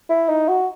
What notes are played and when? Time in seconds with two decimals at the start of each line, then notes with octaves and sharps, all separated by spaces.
0.09 E4
0.29 D#4
0.49 F#4